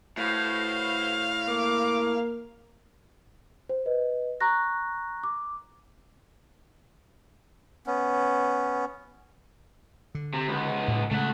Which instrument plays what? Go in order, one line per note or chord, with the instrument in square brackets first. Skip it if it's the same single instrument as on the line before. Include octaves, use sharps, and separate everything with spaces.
[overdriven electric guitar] A2 [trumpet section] F#4 B4 C5 [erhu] F5
[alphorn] A#3 [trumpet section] D6
[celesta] C5
B4 D#5
A#5 C#6 F#6 A#6
D6
[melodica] B3 C#4
[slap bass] D3
[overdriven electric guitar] C3
C#2 B3
[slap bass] A2
[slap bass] C#3 G#3 C#4 [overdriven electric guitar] A3 F#5